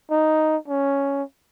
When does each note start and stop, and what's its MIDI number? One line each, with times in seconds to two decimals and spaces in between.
0.11 0.57 63
0.68 1.23 61